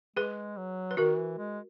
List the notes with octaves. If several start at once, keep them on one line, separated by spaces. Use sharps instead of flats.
G#3 G#4 B4
F#3
B4
D#3 F#4 A#4
E3
G#3